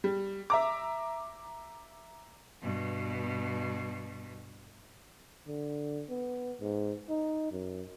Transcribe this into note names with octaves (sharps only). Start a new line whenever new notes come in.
G3
E5 A#5 D6
G2 B2
D3
B3
G#2
D#4
F#2